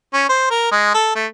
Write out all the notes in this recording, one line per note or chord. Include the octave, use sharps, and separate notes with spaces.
C#4
C5
A#4
G#3
A4
A3